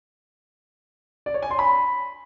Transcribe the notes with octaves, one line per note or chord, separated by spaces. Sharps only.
D5
C#5
G#5
C6
B5